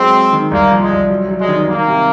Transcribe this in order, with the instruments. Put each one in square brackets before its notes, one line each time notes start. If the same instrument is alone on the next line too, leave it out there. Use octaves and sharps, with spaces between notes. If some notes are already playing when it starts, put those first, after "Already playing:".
Already playing: [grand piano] F#3 G#3 [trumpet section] C4
[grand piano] G#3
D#3
[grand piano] C2 [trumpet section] A#3
[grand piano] F3
[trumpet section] G#3
[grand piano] C2
F#3
F#3
[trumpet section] G#3
[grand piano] D#3
[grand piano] D#3 [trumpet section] A#3
[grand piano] C3